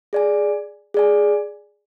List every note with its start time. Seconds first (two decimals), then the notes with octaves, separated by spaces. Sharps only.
0.13 G#4 D5 G#5
0.94 G#4 D5 G#5